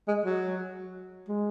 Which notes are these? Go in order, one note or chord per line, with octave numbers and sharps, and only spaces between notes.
G#3
F#3
G#3